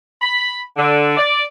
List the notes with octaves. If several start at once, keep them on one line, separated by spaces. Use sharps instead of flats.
B5
D3
D5